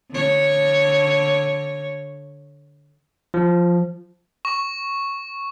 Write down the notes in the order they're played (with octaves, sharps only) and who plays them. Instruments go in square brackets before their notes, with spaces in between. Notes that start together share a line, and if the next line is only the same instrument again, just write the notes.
[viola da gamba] D3 C#5
[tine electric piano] F3
[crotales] C#6